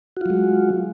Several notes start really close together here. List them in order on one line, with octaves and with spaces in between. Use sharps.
F#4 F4 F#3 G#3